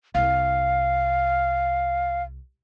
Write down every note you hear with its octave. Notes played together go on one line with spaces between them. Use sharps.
C2 F5